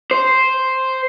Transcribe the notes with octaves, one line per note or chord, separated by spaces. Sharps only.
C5